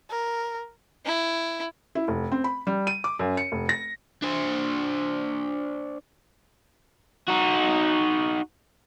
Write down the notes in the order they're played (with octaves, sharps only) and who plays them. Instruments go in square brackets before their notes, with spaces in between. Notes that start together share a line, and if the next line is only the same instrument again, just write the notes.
[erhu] A#4
[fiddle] E4
[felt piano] E4
F1
C4
B5
G3
D#7
D6
F#2
C#7
F1
A#6
[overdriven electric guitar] D4 C5
D#4 F#4